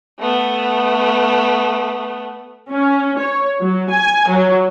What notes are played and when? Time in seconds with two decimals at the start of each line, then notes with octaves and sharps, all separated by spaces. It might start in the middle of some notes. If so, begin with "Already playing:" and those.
0.20 A3 B3
2.71 C#4
3.17 C#5
3.61 F#3
3.91 G#5
4.29 F#3